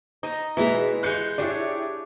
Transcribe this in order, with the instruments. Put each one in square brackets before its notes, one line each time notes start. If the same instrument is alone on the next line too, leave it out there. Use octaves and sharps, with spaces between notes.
[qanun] D#4 D#5
[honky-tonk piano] B2 G#3 [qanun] E3 E4 A#5
[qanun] G#3 F5 [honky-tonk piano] F#6 G6 C#7
[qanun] D4 G#4 C#5 [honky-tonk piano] E4 G4 D5